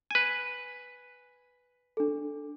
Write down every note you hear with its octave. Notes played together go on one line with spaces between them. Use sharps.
B4 G#5
D4 A4